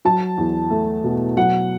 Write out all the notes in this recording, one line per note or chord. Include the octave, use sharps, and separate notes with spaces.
F#3 A5
E2
A3
B2
F#3 F#5